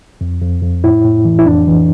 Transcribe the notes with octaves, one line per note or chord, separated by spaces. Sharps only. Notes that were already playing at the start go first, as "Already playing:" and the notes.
F2
F2
F2
A2 E4
A2
E3
E4
F2 D4
E3